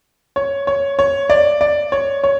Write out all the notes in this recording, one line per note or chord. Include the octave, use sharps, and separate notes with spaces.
C#5
C#5
C#5
D5
D5
C#5
C#5